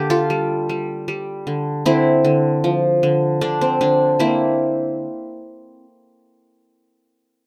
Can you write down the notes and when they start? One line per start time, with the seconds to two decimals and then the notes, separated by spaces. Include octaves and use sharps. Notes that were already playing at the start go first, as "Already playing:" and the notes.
Already playing: D3 A#3 G4
0.10 F4 A4
0.30 G3
0.69 G3
1.08 G3
1.47 D3
1.86 D3 C4 E4
2.25 D3
2.64 F3
3.03 D3
3.41 D3 D4
3.61 C4
3.81 D3 D4
4.19 A#3 C4 E4